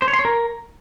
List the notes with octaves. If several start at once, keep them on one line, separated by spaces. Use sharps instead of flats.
C5
C#5
C6
C#5
A#4